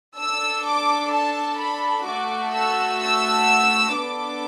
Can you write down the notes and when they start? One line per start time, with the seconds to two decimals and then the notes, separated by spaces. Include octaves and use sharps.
0.17 D4 A4 E6
0.65 D6
1.12 A5
1.59 B5
2.06 A3 F#4 A4 D6
2.53 E6
3.01 E6
3.95 B3 D4 A4 D6